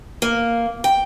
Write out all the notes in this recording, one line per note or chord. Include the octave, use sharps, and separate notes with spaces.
A#3
G5